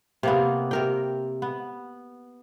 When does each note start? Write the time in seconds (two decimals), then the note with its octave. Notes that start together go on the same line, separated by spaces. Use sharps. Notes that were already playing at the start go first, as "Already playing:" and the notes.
0.23 C3 A#3 B3
0.71 C3 A#4 G5
1.42 B3